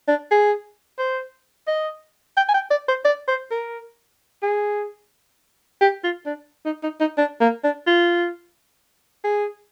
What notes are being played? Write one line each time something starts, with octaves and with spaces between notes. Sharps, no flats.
D4
G#4
C5
D#5
G5
G#5
G5
D5
C5
D5
C5
A#4
G#4
G4
F4
D4
D#4
D#4
D#4
D4
A#3
D4
F4
G#4